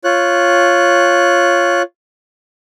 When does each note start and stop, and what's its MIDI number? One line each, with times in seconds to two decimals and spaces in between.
0.04 1.82 65
0.04 1.82 73
0.04 1.82 90